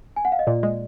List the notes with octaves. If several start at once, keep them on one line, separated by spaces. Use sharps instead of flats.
G#5
F#5
F5
D#5
A#2 D5
G#3